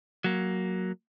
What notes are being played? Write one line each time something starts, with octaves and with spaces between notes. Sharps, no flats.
F#3 A#3